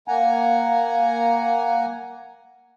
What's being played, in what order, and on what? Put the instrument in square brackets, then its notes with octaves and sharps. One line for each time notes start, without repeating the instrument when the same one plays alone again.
[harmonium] A#3 F#5 G#5 A#5